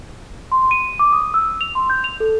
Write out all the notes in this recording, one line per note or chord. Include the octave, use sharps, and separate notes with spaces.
C6
D#7
D6
D#6
E6
F7
C6
G6
F7
A4